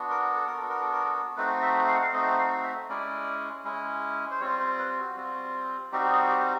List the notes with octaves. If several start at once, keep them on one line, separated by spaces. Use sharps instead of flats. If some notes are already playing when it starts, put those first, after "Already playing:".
Already playing: B3 D4 F#4
A#4
A4
A#4
B3 D4 F#4 A4
A#4
A4
A#4
A4
A3 C4 D#4 F#4 B4
E5
F5
F#5
F5
A3 C4 D#4 F#4 D#5
F5
E5
G#3 C#4 E4 D5
G#3 C#4 E4
C5
G3 C4 F4 C#5
C5
B4
F#4
G3 C4 F4
G3 C4 D#4 F#4 G4
G#4
G4